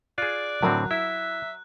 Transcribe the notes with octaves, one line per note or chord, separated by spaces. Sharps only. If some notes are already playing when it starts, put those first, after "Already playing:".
F4 G#4 D5 F#6
A2 D3 F#3 C4 A#4 D#6
E4 E5